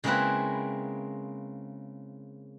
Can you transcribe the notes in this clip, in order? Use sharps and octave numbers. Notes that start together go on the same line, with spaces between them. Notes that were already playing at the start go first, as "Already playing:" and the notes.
C#3 G#3 A#3 C4 E4 B4